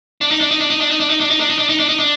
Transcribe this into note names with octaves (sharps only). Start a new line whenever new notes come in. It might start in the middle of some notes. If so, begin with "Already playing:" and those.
D4
D#4
D4
D#4
D4
D#4
D4
D#4
D4
D#4
D4
D#4
D4
D#4
D4
D#4
D4
D#4
D4